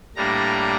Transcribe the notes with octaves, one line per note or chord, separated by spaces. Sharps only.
A2 G3 A#3 D4 A#5